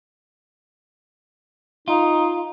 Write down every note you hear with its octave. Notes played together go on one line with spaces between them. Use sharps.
D#4 F4